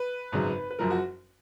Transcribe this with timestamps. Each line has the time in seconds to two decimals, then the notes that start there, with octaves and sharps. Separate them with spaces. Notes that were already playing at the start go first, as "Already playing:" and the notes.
Already playing: B4
0.32 G#1 F#2 C#3 F#3
0.71 B4
0.79 F#1 F#2 F3 A#4
0.91 F#4